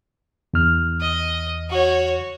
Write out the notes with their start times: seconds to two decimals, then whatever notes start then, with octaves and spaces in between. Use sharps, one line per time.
0.54 E2 F6
1.01 D#5
1.70 F#4 C#5